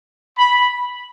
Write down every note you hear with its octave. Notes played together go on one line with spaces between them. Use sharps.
B5